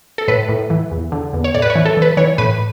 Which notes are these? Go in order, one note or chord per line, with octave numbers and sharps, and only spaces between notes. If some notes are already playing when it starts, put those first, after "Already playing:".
A4
A2 B4
A2
E3
E2
D3
E2
C#5
A2 D5
B4
C#5
E3
A4
E3 B4
E3 C#5
A2 B4